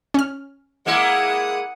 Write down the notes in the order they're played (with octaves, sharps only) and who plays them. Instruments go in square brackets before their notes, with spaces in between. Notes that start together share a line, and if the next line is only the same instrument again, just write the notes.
[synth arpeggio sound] C#4 F6
[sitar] G#3 A#3 E4 [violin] F#5 D#6